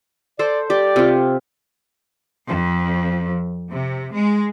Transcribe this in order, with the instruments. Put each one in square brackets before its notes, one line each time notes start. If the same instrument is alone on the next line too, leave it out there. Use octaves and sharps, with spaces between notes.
[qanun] A4 C5 [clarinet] D5
[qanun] G4 [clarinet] D5
[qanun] C3 F4
[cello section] F2
C3
G#3